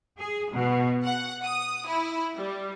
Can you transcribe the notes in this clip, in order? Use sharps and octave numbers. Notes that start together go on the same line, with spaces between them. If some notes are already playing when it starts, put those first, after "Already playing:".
G#4
B2
F#5
D#6
E4
G3